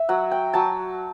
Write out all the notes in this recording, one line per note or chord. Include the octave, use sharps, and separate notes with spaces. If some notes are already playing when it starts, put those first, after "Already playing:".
Already playing: E5
F#3 F#5
G5
F#3 A5